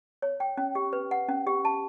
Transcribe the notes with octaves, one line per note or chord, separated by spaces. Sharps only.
C#5
G5
C#4
G4
B4
F#5
C#4
G4
A5